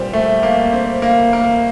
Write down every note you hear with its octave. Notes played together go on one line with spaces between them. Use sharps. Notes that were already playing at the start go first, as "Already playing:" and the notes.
Already playing: A#2 G3 C4
A3
A#3
C4
A#3
A#3